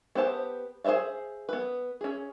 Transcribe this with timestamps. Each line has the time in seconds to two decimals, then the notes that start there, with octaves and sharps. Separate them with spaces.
0.15 B3 G4 C5 A5
0.84 G#4 C5 C#5 E5 F5
1.49 B3 B4
2.01 C#4 G#4